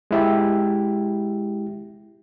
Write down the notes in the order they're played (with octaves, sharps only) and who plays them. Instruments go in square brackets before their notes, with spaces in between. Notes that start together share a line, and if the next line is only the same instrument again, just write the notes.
[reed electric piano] G#3 E4 G4